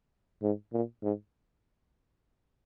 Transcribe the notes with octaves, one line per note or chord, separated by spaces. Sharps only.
G#2
A#2
G#2